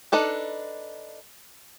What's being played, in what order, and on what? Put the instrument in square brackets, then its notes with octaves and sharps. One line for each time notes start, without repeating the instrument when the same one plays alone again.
[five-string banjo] D4 D#4 A4 B4